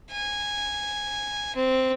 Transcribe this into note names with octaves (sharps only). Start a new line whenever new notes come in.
G#5
C4